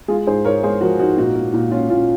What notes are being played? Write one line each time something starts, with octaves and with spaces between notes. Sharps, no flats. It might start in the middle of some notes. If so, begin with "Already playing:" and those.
G#3 F4 G#4
G#2 G#4 C5
G#2 A#4 C#5
G#3 G#4 C5
F3 F#4 A#4
G#2 D#4 F#4
A#2 D#4 F#4
A#3
A#2
A#2 C#4 F4
A#2 C#4 F4